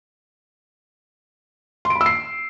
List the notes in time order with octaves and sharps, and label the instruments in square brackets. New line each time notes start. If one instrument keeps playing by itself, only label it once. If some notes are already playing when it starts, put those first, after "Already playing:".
[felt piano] C6
D7
B5
E6
C7